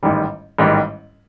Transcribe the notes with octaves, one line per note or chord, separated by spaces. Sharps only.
A1 G#2 D#3 G3
A1 G#2 D#3 G3